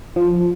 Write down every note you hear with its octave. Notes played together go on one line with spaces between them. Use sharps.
F3